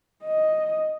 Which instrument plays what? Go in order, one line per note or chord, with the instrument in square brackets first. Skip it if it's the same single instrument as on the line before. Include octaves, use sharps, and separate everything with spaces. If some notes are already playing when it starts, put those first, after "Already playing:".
[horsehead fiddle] D#5